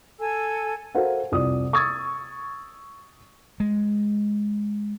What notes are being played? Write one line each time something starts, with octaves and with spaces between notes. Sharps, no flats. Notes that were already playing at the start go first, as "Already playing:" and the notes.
A4 G#5 E6
F#4 A4 A#4 C5 F5 F#5
C2 F2 D5 D#6
C#6 D#6 E6 G#6 A6
G#3